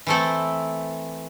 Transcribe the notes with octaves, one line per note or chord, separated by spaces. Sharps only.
E3 A3 C4 E4 A4